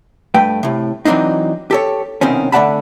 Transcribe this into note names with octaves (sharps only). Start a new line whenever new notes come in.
G2 A3 B4 G5
A2 C3
E3 F#3 G#3 C4 D4 D#4
G4 A4 C#5
C2 B2 D#3 C4 C#4
D3 A3 D5 F#5 A5 B5